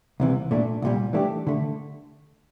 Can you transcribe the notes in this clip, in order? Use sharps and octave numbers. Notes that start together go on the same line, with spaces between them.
C2 C3 E3
A#2 A3 D4
C2 A#2 G3
E3 A3 D4 G4
D3 A3